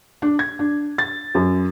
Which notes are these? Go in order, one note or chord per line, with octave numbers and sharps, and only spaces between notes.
D4
G#6
D4
A6
F#2